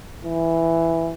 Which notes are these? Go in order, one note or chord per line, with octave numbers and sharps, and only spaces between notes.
E3